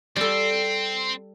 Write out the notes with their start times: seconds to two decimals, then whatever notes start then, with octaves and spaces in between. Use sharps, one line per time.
0.16 G3 C4 A4